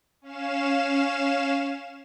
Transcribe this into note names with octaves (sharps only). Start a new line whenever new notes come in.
C#4 F5 E7